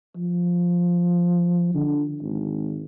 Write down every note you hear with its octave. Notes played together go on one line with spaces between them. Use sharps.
F3
D3
G#1